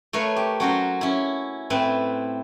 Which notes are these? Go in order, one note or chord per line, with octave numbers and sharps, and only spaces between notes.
A3 A#4 B4 C#5 F5
G4
F#3 C#4 F#4 A#4 C5
C#4 E4
A2 C4 E4 B4